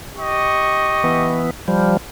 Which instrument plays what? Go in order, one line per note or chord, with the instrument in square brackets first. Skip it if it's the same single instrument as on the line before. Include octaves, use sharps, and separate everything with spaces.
[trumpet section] G4 D#5 C#6
[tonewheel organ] E3 B3
F3 G3